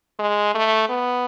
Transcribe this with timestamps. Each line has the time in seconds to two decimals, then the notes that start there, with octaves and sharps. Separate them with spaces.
0.19 G#3
0.55 A3
0.89 B3